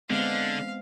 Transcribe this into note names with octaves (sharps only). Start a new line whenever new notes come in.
D3 G#3 B3 C4 F5